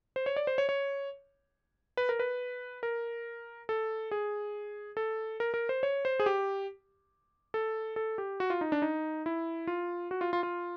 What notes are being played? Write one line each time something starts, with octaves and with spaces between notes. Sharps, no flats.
C5
C#5
D5
C5
C#5
C#5
B4
A#4
B4
A#4
A4
G#4
A4
A#4
A#4
C5
C#5
C5
G#4
G4
A4
A4
G4
F#4
F4
D#4
D4
D#4
E4
F4
F#4
F4
F4
F4